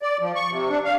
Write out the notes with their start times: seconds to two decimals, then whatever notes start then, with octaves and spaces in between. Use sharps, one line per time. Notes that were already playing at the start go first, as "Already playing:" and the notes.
0.02 D5
0.21 F3
0.35 C#6
0.51 C3
0.69 D4
0.85 F5